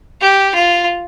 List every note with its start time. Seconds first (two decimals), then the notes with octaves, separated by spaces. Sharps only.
0.21 G4
0.54 F4